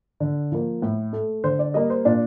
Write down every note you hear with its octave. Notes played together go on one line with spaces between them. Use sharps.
D3
F3 A#3
A2
A3
D3 C5
D5
G3 A#3 D#5
C5
A#2 D4